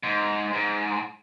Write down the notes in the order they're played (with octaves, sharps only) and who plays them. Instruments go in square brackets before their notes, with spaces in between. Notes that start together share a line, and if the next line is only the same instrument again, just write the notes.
[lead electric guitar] G#2
G#2